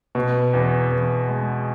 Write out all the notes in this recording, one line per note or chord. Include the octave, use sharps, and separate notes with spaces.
B2
E2
E2
G#3